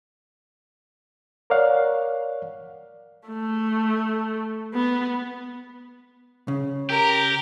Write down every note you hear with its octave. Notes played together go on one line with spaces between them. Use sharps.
A#4 C#5 D5 F5 F#5
A3
B3
C#3
G4 A#4